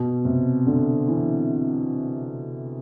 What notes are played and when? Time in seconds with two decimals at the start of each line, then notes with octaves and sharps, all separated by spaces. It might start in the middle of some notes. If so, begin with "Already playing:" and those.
Already playing: B2
0.25 C3
0.66 D3
1.08 E3